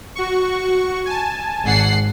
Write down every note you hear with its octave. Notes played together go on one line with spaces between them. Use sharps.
F#4 C#6
G#5 A5
G#1 F#5 C7